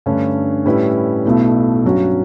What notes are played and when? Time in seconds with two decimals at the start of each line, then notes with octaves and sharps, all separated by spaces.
0.06 G2 D3 A3 C#4
0.65 A2 G3 C#4 E4 B4
1.25 B1 B2 A3 E4
1.84 G2 F#3 C#4 F#4